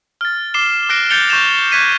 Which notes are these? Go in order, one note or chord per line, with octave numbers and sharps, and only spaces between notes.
F6 A6
D6 C7 E7 G7
D6 F6 F#6 A#6 C7 D7
G6 A6 C#7 F7 G7
C#6 G6 A6 E7 F7
C#6 F#6 G#6 B6 D#7